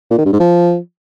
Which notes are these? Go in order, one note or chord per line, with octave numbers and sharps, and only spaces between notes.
A#2
D#3
G2
G#2
F3